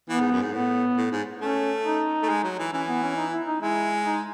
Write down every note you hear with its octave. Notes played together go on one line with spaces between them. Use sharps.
E3 B3
G#2
F#2
G#2
A2 B3
A2
G#2
A3 C#4
D#4
A3
G#3
F#3
E3
E3 C#4
B3
C#4
D#4
E4
D#4
G#3 E4
D#4